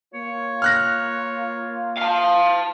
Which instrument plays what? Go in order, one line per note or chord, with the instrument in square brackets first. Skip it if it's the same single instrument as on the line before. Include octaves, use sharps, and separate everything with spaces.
[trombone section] A#3 F4 [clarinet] C#5
[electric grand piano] F6 F#6 A#6
[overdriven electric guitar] F5 A5